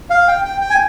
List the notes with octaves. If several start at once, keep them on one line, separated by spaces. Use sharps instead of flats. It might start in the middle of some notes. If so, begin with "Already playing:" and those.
F5
G5
G5
G5
G#5